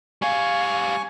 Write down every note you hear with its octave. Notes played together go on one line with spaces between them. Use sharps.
G3 F5 G#5 C#6